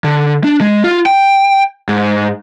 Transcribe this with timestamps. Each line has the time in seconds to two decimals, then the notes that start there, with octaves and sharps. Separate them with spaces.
0.04 D3
0.44 D4
0.61 G#3
0.84 F4
1.06 G5
1.89 G#2